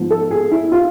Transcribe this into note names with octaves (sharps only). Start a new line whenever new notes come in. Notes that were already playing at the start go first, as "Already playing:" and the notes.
Already playing: G#2 F3 B3
A4
G#4
E4
F4